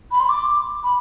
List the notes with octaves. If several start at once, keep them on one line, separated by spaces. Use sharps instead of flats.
B5
C6
D6
B5